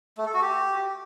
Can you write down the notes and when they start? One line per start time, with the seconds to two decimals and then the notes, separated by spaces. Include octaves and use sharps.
0.18 A3
0.26 A4
0.34 F#4
0.42 G4